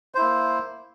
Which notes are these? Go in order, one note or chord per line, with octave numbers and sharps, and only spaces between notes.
A#3 E4 C5